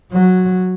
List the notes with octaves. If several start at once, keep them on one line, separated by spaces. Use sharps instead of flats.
F#3